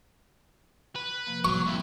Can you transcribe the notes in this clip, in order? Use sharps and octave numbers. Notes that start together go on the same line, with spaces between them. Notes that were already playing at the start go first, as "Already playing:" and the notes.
B4
C3 F3 A#3
F#3 G3 C#6
F2 E4